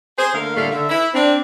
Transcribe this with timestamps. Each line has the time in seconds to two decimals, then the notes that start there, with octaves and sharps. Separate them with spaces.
0.17 G#4 C5
0.34 D3 A3 A#3 A#4 F5
0.55 A2 D3 G3 A3 A#3 F5
0.71 D3 E5
0.89 E4
1.14 C4 D4